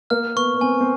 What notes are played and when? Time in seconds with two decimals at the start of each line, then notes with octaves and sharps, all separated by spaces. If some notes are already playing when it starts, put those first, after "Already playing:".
0.10 A#3 F6
0.36 B3 C#6
0.54 B3
0.61 C4 G#5
0.81 C4